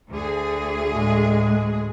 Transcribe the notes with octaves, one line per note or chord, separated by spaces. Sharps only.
D2 G#4
A2 G#3